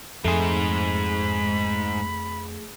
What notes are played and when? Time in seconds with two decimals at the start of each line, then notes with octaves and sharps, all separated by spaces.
0.24 F2 G#2 A3 G#4 C5 B5